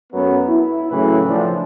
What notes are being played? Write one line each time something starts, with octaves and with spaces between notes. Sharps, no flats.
F#2 F#3 A3 B3
E4
A2 C#3 E3 F#3 A3 B4
A2 F3 D4